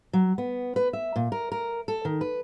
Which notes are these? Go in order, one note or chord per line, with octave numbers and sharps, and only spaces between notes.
F#3
B3
B4
E5
A#2
A#4
A#4
A4
D#3
B4